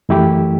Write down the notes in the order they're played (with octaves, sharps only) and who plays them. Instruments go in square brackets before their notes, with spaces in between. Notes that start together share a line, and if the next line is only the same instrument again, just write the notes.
[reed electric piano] F#2 E3 A3 E4 G4